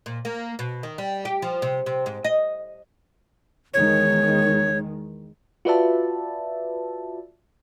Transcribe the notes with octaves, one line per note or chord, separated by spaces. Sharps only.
A#2
A#3
B2
D#3
G3
G4
F3
C3
C3
G#2
D#5
E2 D#3 G#3 C#5
F4 F#4 B4 D5 E5 A5